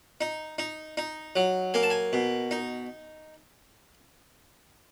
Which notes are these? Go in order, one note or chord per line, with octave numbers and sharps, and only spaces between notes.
D#4
D#4
D#4
F#3
A#3 G#5
A5
G#5
B2
D#4